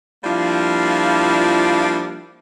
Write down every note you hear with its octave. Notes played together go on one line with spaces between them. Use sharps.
F3 G3 A#3 D4 E4 F4